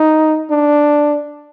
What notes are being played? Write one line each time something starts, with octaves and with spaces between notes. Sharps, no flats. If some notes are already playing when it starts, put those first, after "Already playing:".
Already playing: D#4
D4